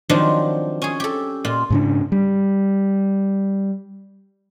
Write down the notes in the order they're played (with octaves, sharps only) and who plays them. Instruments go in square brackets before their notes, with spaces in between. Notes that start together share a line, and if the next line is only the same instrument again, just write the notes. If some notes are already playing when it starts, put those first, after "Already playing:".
[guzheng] D#3 F3 F#3 C4 D4
C#4 G#4
G4 A4
A#2 F4
[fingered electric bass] G#2 C#3 D4
G3